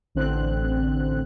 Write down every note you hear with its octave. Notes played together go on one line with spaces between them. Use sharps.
A1 D3 C4 F#6